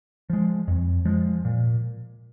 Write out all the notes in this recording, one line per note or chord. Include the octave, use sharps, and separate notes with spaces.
F3 G#3
F2
F3 G#3
A#2